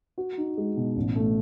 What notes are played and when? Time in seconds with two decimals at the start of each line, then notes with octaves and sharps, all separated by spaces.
0.18 F#4
0.38 D#4
0.57 G#3
0.77 B2
0.96 A1
1.16 A3